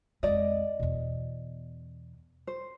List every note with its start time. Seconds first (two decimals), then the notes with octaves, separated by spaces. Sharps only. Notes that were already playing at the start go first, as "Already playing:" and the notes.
0.23 F2 G#3 D5 D#5
0.80 E2 B2
2.47 C5